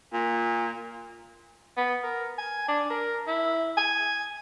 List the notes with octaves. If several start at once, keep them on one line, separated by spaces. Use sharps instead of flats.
A#2
B3
A#4
G#5
D4
A#4
E4
G#5